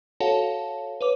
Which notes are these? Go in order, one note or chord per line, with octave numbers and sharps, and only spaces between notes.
F#4 A4 C#5 F5 F#5 A5
B4 C#5 D6